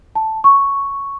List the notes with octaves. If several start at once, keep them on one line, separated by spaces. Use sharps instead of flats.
A5
C#6